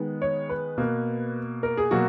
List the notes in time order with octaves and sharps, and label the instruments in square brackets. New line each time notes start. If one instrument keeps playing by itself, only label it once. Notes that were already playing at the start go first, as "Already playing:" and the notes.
Already playing: [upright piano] D#3 G#3 B3
C#5
B4
B2 A#3
A#4
G#4
B2 F#3 A#3 F#4